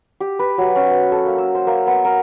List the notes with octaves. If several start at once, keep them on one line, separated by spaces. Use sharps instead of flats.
G4
B4
F#3
C#4
B4
A4
A#3
E6
C5
A#3
B3
A#4